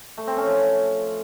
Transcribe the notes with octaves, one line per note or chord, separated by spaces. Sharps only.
A3
C4
C#4
F3